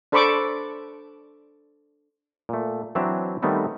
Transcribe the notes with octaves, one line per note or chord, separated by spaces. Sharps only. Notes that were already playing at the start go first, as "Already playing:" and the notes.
D4 A4 C5 B5 C#6 D6
A#2 A3
E3 F#3 C4 D4 E5 A#5
D#3 G3 A3 B3 C4 D#4